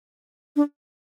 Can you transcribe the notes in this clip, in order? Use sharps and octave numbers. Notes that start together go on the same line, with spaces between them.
D4